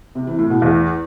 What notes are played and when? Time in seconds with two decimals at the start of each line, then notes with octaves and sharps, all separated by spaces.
0.15 C3
0.27 E3
0.39 A2
0.50 B2
0.62 E2